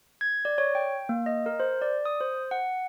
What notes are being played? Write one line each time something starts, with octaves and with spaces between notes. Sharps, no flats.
G#6
D5
C#5
G5
A#3
D#5
A#4
C5
D5
D#6
C5
F#5